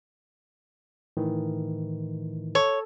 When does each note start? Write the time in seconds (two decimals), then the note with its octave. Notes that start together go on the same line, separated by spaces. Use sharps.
1.17 A2 D#3 E3
2.55 A4 C#5